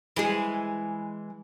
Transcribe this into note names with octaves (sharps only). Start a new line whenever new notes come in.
E3 G#3 G#4